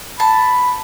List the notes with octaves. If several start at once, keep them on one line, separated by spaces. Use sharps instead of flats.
A5 B5